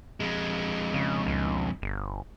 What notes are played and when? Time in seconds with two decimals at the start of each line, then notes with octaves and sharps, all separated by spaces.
0.20 F2 G#3
0.94 C#3
1.27 C#2
1.82 G1